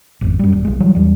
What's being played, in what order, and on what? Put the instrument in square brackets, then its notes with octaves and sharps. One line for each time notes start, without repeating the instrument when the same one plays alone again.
[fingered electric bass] G#1 F2
F#2 G3
D#1
B1 G#3
E3 F#3 G3
E2 G3